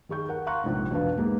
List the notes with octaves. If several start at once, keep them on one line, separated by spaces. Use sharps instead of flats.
D#3 G#4 C#6 G6
A#4 F#5
F5 A#5 C6 C#6 F#6
A#1 G#2 C3
E2 B2 D4 B4 F5
G#2 G#3 A#3 B3